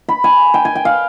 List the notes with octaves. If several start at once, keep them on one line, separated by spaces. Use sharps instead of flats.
B5
G#5
G5
G#5
G5
F5